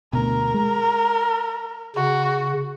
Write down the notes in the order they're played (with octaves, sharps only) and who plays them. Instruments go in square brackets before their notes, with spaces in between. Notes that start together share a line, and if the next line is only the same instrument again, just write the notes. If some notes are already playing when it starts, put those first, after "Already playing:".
[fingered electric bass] D2 B2 [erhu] A#4
[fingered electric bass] G#3
[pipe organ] C#3 [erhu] F#4